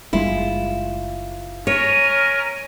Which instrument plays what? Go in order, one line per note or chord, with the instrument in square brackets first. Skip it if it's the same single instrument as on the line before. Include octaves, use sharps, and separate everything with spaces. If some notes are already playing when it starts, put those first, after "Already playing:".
[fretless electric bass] F#1 G3 G#3 [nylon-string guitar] E4 F4
[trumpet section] C#4 A#4 [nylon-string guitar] C#5 [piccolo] D#7